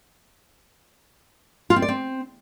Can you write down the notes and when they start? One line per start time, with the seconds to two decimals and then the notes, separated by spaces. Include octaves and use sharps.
1.70 F4
1.76 C4
1.82 D5
1.88 C4